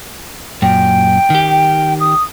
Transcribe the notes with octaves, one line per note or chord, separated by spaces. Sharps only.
F#2 A#2 G5
D#3 G4
D#6